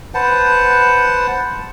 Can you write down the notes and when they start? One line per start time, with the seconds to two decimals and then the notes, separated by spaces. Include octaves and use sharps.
0.14 B4 C5 F#5 A5